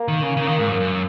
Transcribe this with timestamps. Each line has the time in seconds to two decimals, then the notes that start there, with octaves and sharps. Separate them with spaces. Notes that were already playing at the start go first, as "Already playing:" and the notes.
Already playing: A#3
0.08 D#3
0.23 C#3
0.37 C#3
0.47 D#3
0.59 G#2
0.69 F#2
0.80 F#2